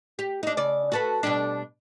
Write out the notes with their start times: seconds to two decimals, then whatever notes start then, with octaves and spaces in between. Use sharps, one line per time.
0.19 G4
0.43 D4 D#4
0.57 C#3 D5
0.92 F#4 A4 B4
1.23 B2 G3 D4